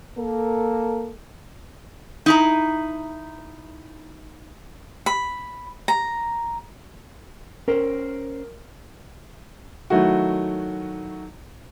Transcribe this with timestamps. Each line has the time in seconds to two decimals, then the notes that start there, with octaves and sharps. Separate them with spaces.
0.18 A#3 A4
2.26 D#4 E4 A#5
5.06 B5
5.88 A#5
7.68 C#4 A#4 C5
9.90 D#3 F#3 A3 E4 F#4